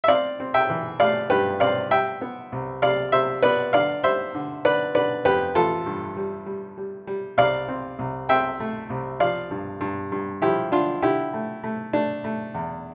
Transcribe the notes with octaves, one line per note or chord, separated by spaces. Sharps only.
E5
C4 D5 F5
C4
E5 G5
E3
A3 D5 F5
G2 G4 B4
C4 D5 F5
G3 E5 G5
B3
C2
C3 D5 F5
C3 C5 E5
B3 B4 D5
D3 D5 F5
G3 C5 E5
D3
D3 B4 D5
D3 B4 D5
F2 G4 B4
A1 F4 A4
G2
G3
G3
G3
G3
C2 D5 F5
C4
C2
C4 E5 G5
A3
C2
F3 D5 F5
G2
G2
G2
F3 E4 G4
D3 D4 F4
D3 E4 G4
A3
A3
A3 D4
A3
E2